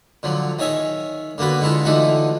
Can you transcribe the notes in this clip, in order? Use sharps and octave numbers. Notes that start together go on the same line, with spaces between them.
D3 F3 F#3
D#3 G#4 C#5 E5 G#5
D3 A#3 B3 F#4 B4
D3 G#3 E4 F4 A4
D3 E3 A3 D#4 F4 F#4